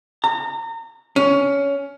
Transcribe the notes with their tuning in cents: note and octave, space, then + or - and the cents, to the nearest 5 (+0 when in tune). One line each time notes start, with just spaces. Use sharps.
A#5 -30
C#4 +15